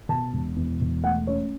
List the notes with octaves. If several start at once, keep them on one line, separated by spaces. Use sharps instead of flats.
B2 A5
E1
E2
E1
A3 F#5
C#4 C#5